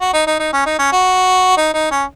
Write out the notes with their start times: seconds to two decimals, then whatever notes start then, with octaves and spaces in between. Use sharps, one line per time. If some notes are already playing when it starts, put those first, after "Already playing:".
0.01 F#4
0.13 D#4
0.26 D#4
0.39 D#4
0.53 C#4
0.66 D#4
0.79 C#4
0.92 F#4
1.57 D#4
1.74 D#4
1.91 C#4